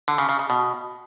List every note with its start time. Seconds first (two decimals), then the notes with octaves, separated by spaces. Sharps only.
0.08 D3
0.18 C#3
0.29 C#3
0.39 C#3
0.50 B2